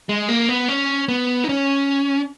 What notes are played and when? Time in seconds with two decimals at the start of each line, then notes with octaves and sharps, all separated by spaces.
0.09 G#3
0.29 A#3
0.49 B3
0.68 C#4
1.08 B3
1.44 D#4
1.49 C#4